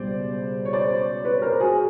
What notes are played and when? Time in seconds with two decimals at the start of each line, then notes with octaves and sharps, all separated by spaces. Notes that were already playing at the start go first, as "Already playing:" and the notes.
Already playing: C#2 B2 G3 C5 D5
0.65 C#5
0.73 C5 D5
1.25 B4 C#5
1.42 A#4 C5
1.60 F#4 G#4